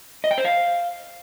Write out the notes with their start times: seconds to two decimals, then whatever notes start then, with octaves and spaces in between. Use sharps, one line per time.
0.24 D#5
0.31 G5
0.38 C5
0.45 F5